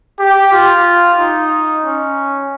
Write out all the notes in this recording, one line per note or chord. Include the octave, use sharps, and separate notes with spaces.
G4
F4
D#4
C#4